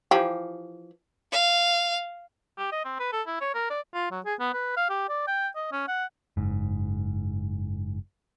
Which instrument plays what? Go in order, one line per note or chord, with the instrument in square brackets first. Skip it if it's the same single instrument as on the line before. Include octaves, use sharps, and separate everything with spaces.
[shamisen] E3 F3 G4
[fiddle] F5
[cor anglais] G4
D#5
C4
B4
A4
E4
C#5
A#4
D5
F4
F#3
G#4
B3
B4
F5
G4
D5
G5
D#5
C#4
F#5
[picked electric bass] F#1 G#2